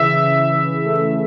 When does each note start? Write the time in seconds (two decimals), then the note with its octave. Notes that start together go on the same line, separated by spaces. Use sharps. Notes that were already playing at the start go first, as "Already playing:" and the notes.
Already playing: C#3 E3 E5
0.23 C#3
0.54 E3
0.84 A3